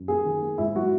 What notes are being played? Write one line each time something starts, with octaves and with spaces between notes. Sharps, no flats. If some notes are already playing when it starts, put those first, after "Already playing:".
Already playing: F#2
A#3 G#4
D#3
A#3
G#2 E4
F#3 F#4